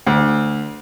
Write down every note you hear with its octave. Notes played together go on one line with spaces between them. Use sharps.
D2